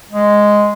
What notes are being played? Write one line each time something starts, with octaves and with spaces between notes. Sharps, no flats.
G#3